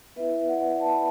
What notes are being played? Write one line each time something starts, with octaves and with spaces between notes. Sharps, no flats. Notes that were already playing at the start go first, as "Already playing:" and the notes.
B3 E4 B4 E5
D5 F#5
A5
B5